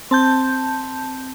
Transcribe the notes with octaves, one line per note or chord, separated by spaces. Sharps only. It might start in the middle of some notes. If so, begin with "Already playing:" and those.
C4 A5 G6